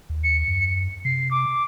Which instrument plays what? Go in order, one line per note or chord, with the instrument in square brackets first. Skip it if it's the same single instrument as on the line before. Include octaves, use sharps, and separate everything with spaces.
[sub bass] D#2
[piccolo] C#7
[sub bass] F#2
[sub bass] C3 [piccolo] C7
[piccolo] D6